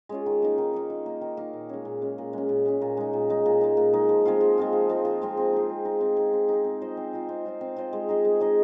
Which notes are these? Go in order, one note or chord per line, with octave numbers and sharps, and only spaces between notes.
G#3 C#4 F4
D#3
A#3 D#4
D#3
A#3 D#4
D#3
A#3 D#4
D#3
A#3 D#4
A#2
G#3 C#4
A#2
G#3 C#4
A#2
G#3 C#4
A#2
G#3 C#4
A#2
G#3 D#4
A#2
G#3 D#4
A#2
G#3 D#4
A#2
G#3 D#4
F3
G#3 C4 F4
F3
G#3 C4 F4
F3
G#3 C4 F4
F3
G#3 C4 F4
C4
D#4 G#4
C4
D#4 G#4
C4
D#4 G#4
C4
D#4 G#4
C4
F4 C5 D#5
C4
F4 C5 D#5
C4
F4 C5 D#5
C4
F4 C5 D#5
G#3
D#4 G#4 D#5
G#3
D#4 G#4 D#5